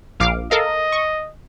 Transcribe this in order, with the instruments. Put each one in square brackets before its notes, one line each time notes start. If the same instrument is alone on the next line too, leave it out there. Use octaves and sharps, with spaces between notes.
[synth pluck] A#1 F5 D6
[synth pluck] A4 A#4 F5 [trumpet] D#5
[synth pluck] C#6